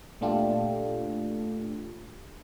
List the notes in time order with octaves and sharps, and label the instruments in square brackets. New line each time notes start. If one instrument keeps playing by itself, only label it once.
[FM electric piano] A#2 A3 D4 F4 G4 A4